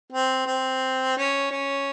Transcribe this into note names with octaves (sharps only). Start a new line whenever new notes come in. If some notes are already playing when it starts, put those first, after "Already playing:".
C4
C4
C#4
C#4